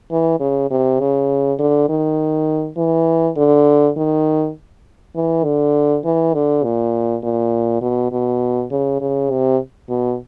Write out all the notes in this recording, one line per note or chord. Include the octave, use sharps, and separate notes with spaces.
E3
C#3
C3
C#3
D3
D#3
E3
D3
D#3
E3
D3
E3
D3
A#2
A#2
B2
B2
C#3
C#3
C3
B2